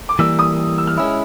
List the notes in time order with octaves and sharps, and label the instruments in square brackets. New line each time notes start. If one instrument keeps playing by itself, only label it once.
[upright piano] D6
[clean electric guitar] E3 G3 A#3 [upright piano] E6
[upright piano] D#6
E6
F6
[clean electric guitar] G#3 C#4 E4 [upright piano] E6